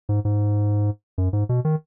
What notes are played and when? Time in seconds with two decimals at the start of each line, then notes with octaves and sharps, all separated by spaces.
0.09 G#2
0.25 G#2
1.18 F#2
1.33 G#2
1.49 B2
1.65 D#3